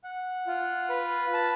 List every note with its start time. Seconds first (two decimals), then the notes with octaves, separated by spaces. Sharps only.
0.04 F#5
0.47 F4
0.90 B4
1.34 A5